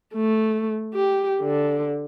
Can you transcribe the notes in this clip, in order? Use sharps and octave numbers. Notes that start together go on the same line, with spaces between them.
A3
G4
D3